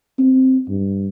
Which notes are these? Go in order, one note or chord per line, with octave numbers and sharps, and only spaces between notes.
C4
G2